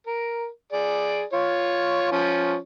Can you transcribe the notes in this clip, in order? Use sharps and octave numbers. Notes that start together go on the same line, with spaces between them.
A#4
G#4 D5
F4 C#5
F3 C#4